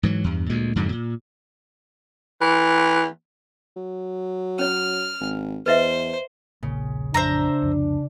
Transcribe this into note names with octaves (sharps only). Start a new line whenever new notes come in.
G#2 E3 F#3
E2 G2
D2 A#2 G#3
F2 G#2 D3 F#3
A#2
E3
F#3
C#4 C#5 F6
G#1
E2 B4 C5 D#5 E5
D#1 A#1 A#2 C#3
A1 F2 D4 C5 E5 A#5
C2 F2